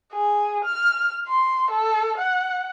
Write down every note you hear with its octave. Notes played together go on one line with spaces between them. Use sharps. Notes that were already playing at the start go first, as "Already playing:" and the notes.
G#4
F6
C6
A4
F#5